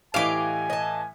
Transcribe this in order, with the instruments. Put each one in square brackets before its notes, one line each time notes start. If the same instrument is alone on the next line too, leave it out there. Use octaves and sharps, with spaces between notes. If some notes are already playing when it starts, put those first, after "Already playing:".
[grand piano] A2 E3 B6 [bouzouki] G4 D#5 [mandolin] F5 D6 [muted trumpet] G#5
[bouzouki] D#5 A5